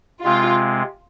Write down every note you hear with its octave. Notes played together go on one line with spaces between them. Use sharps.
C3 G#3 C4 F4